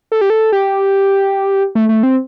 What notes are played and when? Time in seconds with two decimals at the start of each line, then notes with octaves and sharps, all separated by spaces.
0.12 A4
0.21 G4
0.30 A4
0.52 G4
1.75 A3
1.89 A3
2.03 C4